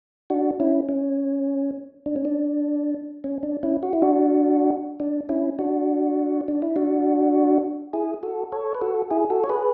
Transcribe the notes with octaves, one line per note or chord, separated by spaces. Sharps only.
D4 F#4
C#4 E4
C#4
D4
C#4
D4
C#4
D4
C#4 E4
F#4
E4
D4 F#4
D4
C#4 E4
D4 F#4
D4
E4
D4 F#4
E4 G#4
F#4 A4
A4 C#5
B4
F#4 A4
E4 G#4
F#4 A4
C#5
G#4 B4